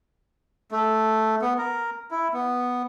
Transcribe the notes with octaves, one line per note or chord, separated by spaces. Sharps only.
A3
B3
A#4
E4
B3